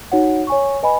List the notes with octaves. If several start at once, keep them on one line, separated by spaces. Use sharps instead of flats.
D#4 F#4 C#5 F#5
C#5 G#5 C#6
B4 D#5 G#5 B5